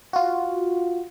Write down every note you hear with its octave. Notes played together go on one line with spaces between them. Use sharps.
F4 F#4